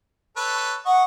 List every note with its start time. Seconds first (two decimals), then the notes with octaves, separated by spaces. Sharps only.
0.37 A4 B4 C#5
0.85 D#5 F#5 C#6